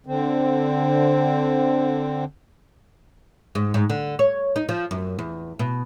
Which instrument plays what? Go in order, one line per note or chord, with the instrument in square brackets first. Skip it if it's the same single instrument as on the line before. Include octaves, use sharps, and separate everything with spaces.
[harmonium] D3 C4
[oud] G#2
G#2
D3
C#5
D#4
F3
F#2
E2
B2